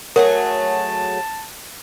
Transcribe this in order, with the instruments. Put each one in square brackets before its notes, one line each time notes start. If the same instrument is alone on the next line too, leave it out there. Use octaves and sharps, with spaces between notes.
[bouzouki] F#3 A3 G#4 [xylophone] A#4 [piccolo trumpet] A5